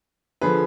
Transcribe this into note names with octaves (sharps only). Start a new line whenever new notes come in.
D3 F3 G#4 B4